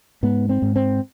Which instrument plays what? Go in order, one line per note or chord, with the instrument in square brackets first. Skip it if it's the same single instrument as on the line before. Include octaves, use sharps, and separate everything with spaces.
[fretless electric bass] G#2 B3
C4
G#2
C4